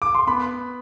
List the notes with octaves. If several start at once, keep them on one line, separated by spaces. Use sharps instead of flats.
D6
C6
B3 B5